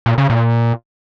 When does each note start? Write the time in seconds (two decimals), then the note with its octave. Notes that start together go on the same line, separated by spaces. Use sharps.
0.06 A#2
0.18 C#3
0.30 A#2